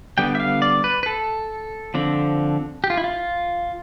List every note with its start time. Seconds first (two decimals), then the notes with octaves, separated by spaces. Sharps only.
0.18 D3 G3 B3 G5
0.35 E5
0.40 F5
0.62 D5
0.84 B4
1.03 B4
1.06 A4
1.94 D3 F3 C4
2.84 G4
2.90 F4
2.97 E4
3.04 F4